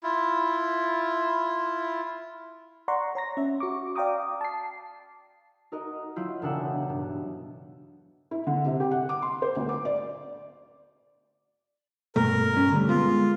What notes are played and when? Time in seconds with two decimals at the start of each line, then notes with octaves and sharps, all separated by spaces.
0.03 E4 F4
2.88 D5 F#5 A#5 C6 C#6
3.15 C#5 A#5 A#6
3.37 C#4 E5
3.60 F#4 C#6 D6
3.96 D5 F5 G5 A#5 D6 D#6
4.41 A5 C7
5.72 D#4 F#4 A#4 D#5
6.16 F#3 E4 F4 G6
6.42 E1 C#3 D4 A#4 E5 F#5
6.88 G2 B2
8.31 E4
8.47 D3
8.66 C3
8.80 G4
8.91 F#5
9.09 D6
9.22 C6
9.42 C5
9.56 D2
9.69 D6
9.85 D5
12.16 G2 B2 A3 A#4
12.53 G2 C#4
12.72 D3 G3 A3
12.89 G#3 B3 F4